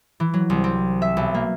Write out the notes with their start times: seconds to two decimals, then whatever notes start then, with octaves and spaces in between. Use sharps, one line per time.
0.20 E3
0.34 F#3
0.50 C2
0.64 C4
1.02 E5
1.17 B1
1.34 A#3